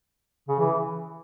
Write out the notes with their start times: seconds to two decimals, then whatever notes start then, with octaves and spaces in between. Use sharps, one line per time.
0.49 C#3
0.59 E3